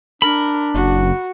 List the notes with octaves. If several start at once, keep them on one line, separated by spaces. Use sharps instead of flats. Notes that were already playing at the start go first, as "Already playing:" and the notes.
D4 A#4 B5
F#1 F#4